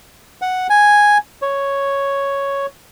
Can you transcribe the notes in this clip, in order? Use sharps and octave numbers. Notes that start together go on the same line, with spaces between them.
F#5
G#5
C#5